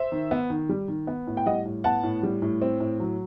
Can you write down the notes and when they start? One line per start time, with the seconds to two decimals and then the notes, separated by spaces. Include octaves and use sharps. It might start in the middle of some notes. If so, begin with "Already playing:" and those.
Already playing: C5 E5
0.12 D#3
0.31 B3
0.50 D#3
0.69 G3
0.88 D#3
1.07 B3
1.27 A2
1.37 G5
1.46 G3 D#5 F#5
1.65 A2
1.84 B3 F#5 A5
2.03 A2
2.23 G3
2.42 A2
2.62 C4
2.80 A2
3.00 F#3